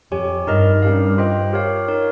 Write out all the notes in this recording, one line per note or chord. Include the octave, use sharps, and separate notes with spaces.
F2 G4 C#5 G#5
G2 D#4 A#4 D#5
G2 C#4 G4 A#4 F5
F4 C5 D#5 G5
G4 A#4 C#5 F5
D#4 A#4 C#5